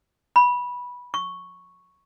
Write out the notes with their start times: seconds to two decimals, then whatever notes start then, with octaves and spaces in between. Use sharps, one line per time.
0.36 B5
1.14 C#6